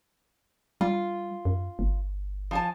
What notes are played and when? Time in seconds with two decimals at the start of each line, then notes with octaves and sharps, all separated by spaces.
0.81 G3 F4
1.45 F#2
1.79 G1
2.51 F3 G#5 A5